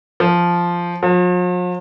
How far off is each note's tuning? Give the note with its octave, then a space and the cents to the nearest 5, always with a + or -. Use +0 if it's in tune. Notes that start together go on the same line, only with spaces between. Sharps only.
F3 -5
F3 +45